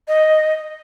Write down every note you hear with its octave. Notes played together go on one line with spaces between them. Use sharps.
D#5